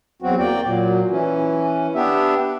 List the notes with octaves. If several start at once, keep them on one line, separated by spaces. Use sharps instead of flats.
E2 F#3 C4 F#4
A#3 D5 G5
A#2 F#3
E3 C#4
B3 D4 G4 E5